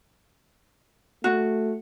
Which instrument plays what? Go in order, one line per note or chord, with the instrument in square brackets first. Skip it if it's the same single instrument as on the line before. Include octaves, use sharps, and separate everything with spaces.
[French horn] A3 [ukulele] F#4